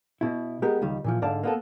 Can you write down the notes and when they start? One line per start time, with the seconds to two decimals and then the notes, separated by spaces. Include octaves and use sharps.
0.21 B2 E4
0.62 G#3 B3 G4 A#4
0.82 C#2 D#3 G3
1.04 A#2 E3 F3
1.22 G#2 D3 D5 F5 A5
1.43 A#3 B3 A4